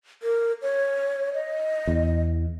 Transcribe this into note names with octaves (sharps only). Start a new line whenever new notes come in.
A#4
C#5
D#5
E2